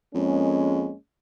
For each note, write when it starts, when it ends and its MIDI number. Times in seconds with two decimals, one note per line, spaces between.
0.14 0.90 41
0.14 0.95 56
0.14 0.95 58
0.14 0.95 61